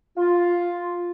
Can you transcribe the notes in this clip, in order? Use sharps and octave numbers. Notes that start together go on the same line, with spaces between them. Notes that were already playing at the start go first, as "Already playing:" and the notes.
F4